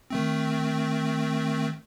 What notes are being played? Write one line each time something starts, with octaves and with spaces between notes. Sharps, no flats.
D#3 A3 C4